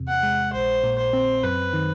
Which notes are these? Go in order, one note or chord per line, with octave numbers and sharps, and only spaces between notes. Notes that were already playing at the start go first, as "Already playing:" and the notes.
Already playing: E2 C3
F#5
G#3
A#1 C5
A#2
C5
C4
F#2 B4
D#3